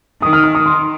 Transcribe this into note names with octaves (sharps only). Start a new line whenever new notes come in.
D#3 D#6
F6
F6
D#6
D#3 C6